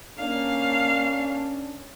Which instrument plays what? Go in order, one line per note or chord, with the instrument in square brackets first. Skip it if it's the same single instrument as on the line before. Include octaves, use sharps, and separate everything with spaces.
[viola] A#3 F5 [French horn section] C#4 D4